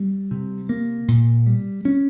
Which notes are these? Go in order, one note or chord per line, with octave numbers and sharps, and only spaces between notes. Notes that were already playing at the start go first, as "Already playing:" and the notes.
Already playing: G3
C3
A#3
A#2
G3
C#4